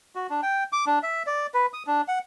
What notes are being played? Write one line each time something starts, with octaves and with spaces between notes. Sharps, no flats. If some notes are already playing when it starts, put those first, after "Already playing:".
F#4
D4
G5
D6
D4
E5
D5
B4
D#6
D4
F#5